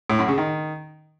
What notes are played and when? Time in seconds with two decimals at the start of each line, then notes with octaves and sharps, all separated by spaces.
0.10 A2
0.19 F#2
0.28 C#3
0.38 D#3